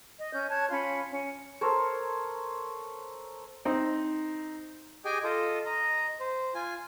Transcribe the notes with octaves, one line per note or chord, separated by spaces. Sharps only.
D#5
C#4 G6
C#5 A5 F#6 G#6
C#4 F4 B5 C6
C#4
A4 A#4 C5 C#5
C4 D#4
G4 G#4 D#5 G5 G#5
F4 A4 D#5
D#5 A#5
C5
F4 G#5